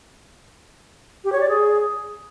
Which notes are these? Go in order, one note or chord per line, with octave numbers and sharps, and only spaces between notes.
G4
C#5
D5
G#4